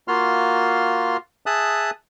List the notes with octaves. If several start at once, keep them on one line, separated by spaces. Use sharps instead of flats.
A#3 F4 F#4 C6 F6
G#4 E5 A5 D#6 F#6